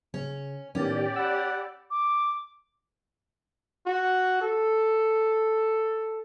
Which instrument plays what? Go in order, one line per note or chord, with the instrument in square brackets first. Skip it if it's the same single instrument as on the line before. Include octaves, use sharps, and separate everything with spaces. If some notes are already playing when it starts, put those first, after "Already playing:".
[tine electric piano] C#3 [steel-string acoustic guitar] C#4
[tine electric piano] A2 D#3 B3 [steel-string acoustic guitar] C#4 [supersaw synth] G4 D5
[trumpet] F#5 [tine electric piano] B5 E6
[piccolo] D6
[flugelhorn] F#4
A4